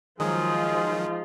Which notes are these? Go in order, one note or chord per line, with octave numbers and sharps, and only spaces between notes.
D#3 F3 F#3 G#3 D#4 F4 G#4